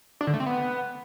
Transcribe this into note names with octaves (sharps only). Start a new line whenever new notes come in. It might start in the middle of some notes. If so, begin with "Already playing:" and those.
D4
D3
A3
C4
B3